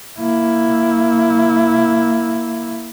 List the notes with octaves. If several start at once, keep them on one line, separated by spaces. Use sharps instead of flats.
A#3 E4